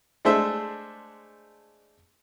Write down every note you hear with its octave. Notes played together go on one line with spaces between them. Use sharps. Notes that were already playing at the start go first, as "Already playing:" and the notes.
G#3 A3 D4 C5 E5